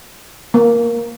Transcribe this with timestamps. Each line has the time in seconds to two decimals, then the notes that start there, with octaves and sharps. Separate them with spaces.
0.54 A#3